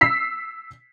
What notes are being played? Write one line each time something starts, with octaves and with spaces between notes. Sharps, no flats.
E6 B6 C7